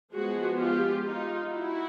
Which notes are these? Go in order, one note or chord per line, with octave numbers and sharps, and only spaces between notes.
F3 G#3 B3 F#4 G#4
F4 G4
D#4 F4
E4 F#4